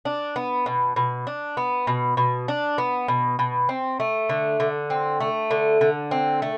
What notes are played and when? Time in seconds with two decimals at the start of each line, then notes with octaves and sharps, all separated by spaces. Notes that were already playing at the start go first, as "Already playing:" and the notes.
0.05 D4
0.36 B3
0.66 B2
0.96 B2
1.27 D4
1.57 B3
1.87 B2
2.17 B2
2.48 D4
2.78 B3
3.08 B2
3.39 B2
3.69 C4
4.00 A3
4.29 D3
4.60 D3
4.90 C4
5.20 A3
5.51 D3
5.81 D3
6.11 C4
6.42 A3